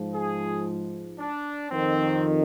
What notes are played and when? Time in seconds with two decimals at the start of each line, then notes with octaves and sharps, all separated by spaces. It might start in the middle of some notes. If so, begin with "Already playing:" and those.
Already playing: G#2 F3
0.12 G#4
1.18 D4
1.70 F2 D#3 C4